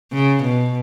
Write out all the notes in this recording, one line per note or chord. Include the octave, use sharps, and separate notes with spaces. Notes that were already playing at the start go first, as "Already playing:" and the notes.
C#3
B2